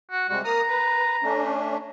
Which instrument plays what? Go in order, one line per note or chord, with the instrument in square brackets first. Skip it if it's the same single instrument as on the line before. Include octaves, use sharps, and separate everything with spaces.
[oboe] F#4
[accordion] C3 G3 G#3 [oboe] F#4
[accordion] A#3 D#6 F6 [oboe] A#5
[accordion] B4
A3 C#4 D4